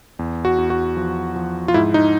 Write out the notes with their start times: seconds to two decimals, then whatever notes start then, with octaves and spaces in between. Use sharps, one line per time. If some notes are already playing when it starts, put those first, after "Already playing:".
0.19 E2
0.45 F#4
0.58 E2
0.70 F#4
0.97 F3
1.36 F3
1.68 F4
1.74 G#2 E4
1.94 D#4